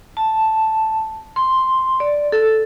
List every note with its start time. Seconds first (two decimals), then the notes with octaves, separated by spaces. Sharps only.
0.17 A5
1.36 C6
2.00 D5
2.32 A4